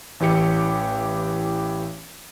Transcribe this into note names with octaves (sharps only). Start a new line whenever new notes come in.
A1 E3 G4 C#7